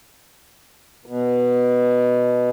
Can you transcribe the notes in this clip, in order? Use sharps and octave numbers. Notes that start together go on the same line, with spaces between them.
B2